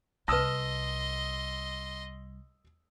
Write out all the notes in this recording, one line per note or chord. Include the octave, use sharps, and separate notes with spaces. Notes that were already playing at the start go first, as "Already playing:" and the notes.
C2 B4 D#5 A5 C6 D#6 E6 A#6